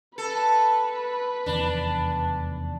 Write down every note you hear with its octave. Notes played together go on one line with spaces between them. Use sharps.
A4 B4
F1 E2 D#3 D4